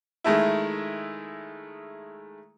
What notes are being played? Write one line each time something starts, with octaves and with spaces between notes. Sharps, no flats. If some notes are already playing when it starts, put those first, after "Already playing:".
D#3 G#3 A3 E4